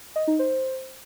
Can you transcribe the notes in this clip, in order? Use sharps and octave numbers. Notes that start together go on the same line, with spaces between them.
D#5
D#4
C5